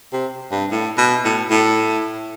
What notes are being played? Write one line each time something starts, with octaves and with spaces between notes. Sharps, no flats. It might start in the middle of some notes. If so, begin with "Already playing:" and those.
C3
G2
A2
B2
A2
A2